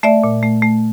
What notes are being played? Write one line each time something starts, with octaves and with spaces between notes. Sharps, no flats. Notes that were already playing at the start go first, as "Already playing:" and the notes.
A3 D5 E5
A#2
A3
A3